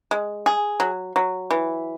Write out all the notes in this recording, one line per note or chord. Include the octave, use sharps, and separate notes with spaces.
G#3
G#4
F#3
F#3
E3